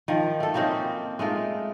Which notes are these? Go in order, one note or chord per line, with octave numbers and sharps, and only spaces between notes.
D#3 F3
A3 A4
A#3 C4 C#4 D#4
G#3 A3 D#4 F4